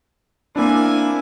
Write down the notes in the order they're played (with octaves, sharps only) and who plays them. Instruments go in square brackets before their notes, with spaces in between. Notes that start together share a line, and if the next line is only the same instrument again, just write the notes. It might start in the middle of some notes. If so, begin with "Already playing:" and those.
[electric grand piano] A#3 C4 D4 [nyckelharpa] E4 G#5